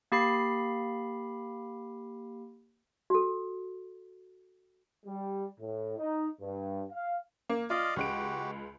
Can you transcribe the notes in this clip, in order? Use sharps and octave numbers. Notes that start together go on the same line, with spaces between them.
A#3 G4 B5 C7
F#4 A4
G3
A2
D#4
G2
F5
A#3
F4 D5 D#5 F5
C#2 G#3 F#4 G4 D7